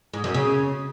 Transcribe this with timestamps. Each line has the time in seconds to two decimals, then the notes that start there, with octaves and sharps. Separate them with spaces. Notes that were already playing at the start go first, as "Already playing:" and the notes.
0.14 G#2
0.24 F#2
0.34 C#3